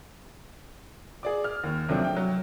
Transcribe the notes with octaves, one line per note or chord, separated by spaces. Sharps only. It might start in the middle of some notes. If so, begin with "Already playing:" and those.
G#4 D5 D6
F6
D#2
C3 F3 F#3 A3 C4 D4
G5
F#3